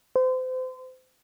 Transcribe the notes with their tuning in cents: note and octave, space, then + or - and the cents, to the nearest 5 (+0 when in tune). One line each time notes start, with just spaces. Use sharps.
C5 -35